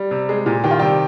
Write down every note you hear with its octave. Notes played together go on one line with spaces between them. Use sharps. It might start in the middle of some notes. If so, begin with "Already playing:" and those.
Already playing: G3
C3
G#3
A#2
D#3 G4
F4
C3 G3 G4